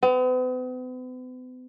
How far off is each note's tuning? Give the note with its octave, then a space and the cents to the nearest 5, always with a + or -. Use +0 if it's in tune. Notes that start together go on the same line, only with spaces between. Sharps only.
B3 +45